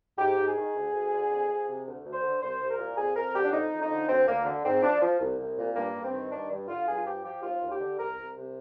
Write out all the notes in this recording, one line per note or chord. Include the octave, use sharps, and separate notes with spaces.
G#2 G4
G#2
G#4
D#3
D2
D2
D3
F2
F2
C3
D2
D2
C5
D3
C2 C5
C2
A#4
A#2
F2 G#4
F2 A#4
D3 G4
D4
F2 D#4
F2
D#4
D3
D2 C4
D2 A#3
D3
G#2 C4
F3 D4
F3
C2
C2
A#2
G2 A#3
G2
C4
D#3
G2 D4
G2
D3 F4
G2 G#4
F4
F3 G4
F3 G4
D#2 F4
D#2
G4
D3
C2 A#4
C2
C3